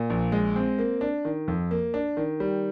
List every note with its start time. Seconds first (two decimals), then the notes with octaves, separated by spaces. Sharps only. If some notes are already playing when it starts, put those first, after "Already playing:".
Already playing: A#2
0.10 A#1
0.32 G#3
0.56 C4
0.79 A#3
1.01 D4
1.25 D#3
1.48 F2
1.71 A#3
1.94 D4
2.17 D#3
2.40 G3